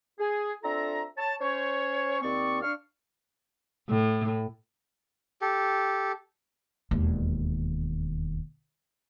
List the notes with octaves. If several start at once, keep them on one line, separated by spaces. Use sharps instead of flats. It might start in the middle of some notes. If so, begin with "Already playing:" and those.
G#4
C4 D4 F4 A4 E5 A#5
C#5 A5
C#4 C5 C#5
D#2 C4 D5 C#6
D4 F5 C#6 F6
A2
G4 A4
E1 D#2